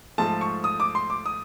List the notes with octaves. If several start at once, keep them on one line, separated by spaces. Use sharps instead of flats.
G#2 F3 A3 A5
C#6
D#6
D6
C6
D6
D#6